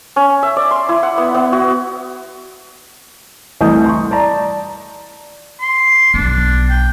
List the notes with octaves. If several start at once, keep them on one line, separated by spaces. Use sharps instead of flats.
C#4
E5
D5
C6
E4
F#5
B3
B3
F#4
C2 E3 A3 D#5 D#6 G6
C6 C#6
D5 A5 A#5
C6
B1 B3 D4
G5